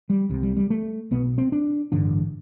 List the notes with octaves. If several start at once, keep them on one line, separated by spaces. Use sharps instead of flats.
G3
C2 C3
G3
G3
A3
B1 B2 B3
C4
D4
A1 G2 D3 D4